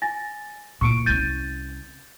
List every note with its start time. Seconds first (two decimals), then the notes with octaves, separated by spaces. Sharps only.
0.02 G#5 A6 A#6
0.81 A#2 E3 C#6 C#7 D7
1.06 C2 C#4 G6 A6 D#7